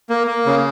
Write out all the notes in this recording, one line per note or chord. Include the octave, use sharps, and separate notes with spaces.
A#3
A#3
C#3